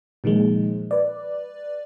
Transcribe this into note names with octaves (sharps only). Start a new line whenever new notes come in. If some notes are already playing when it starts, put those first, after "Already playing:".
A#2 D#3 F3 G#3
B4 D5